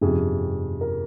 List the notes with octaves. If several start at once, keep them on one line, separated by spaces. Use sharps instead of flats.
G1 F2 C3 G#4
A#4